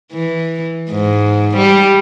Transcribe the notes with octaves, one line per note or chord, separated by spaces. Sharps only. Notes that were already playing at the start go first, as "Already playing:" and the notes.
E3
G#2
G3